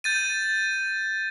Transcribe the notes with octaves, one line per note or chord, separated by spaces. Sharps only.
G6 A6 D#7